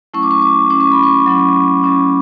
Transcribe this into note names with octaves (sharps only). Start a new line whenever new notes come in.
F#3 A3 C#4 E4 C#6
D6
C#6
D6
F#3 A3 C#4 E4 D6
C#6
B5
C#6
F#3 A3 C#4 E4
F#3 A3 C#4 E4